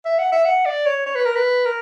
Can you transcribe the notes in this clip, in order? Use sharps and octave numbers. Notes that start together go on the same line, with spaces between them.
E5
F#5
E5
F#5
D5
C#5
C#5
B4
A#4
B4
A#4